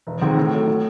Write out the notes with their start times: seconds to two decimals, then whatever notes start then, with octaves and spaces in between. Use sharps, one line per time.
0.07 E1
0.22 D#2 D#3 G#3 C4
0.37 A2
0.52 F#3 A3
0.68 A2